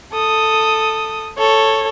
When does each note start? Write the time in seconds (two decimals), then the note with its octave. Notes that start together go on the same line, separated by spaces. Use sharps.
0.13 A4 D#6
1.38 A4 C#5